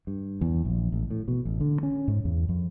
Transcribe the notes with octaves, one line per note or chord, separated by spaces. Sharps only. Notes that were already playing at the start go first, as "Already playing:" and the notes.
G2
E2
A#1
A1
A2
B2
A1
D3
C#4
G#2
E2
F2